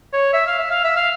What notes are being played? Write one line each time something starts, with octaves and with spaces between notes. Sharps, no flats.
C#5
E5
F5
E5
F5
E5
F5